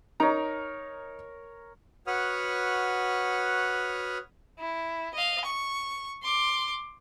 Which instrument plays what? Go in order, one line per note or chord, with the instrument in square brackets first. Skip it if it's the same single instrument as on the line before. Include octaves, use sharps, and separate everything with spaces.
[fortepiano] D#4 A#5 [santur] A#4 C#5
[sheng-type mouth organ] F#4 B4 C#5 F#5 D#6 F6
[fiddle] E4
D#5 F5
C#6
C6 D6